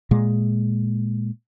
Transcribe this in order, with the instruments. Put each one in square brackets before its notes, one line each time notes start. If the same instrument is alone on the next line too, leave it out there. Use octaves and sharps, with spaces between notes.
[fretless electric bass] A#2 G#3